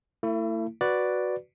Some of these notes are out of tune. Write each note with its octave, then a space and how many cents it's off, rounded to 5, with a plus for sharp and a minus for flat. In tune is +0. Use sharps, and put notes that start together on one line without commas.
A3 +40 E4 +10
F#4 +0 B4 +0 D5 +0